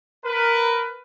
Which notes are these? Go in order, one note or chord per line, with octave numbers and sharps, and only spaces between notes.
A#4 B4